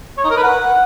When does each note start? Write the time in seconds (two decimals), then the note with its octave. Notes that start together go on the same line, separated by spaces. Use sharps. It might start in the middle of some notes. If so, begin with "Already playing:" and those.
0.17 C#5
0.24 D#4
0.30 A#4
0.37 B4
0.43 F#5